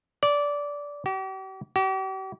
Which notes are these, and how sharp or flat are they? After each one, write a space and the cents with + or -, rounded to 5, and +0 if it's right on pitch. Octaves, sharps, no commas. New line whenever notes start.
D5 -15
G4 -45
G4 -45